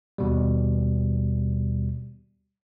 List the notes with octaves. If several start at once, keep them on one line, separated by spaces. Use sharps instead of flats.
D#2 B2 G3